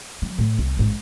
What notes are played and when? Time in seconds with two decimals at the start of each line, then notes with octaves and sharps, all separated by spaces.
0.22 F3 F#3
0.38 A2
0.58 C2 B3
0.77 A1 G#2